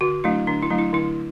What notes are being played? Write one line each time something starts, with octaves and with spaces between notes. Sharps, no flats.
D3 F#4
F#3 A3 D4 E4
D3 D4
E4
F#3 A3 D4
E4
D3 E4